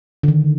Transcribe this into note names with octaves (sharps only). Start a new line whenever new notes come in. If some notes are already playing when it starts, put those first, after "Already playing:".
D3
D#3